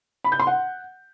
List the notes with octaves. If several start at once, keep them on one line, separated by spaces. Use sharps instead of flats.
B5
G6
C6
F#5